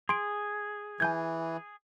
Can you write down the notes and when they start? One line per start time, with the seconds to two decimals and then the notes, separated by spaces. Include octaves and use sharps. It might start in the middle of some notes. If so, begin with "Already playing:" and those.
0.09 G#4 C6 D7
1.00 E3 G#5 G6 G#6